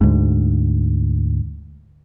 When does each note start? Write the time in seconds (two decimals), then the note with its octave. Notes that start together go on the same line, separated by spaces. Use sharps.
0.01 D2 G#2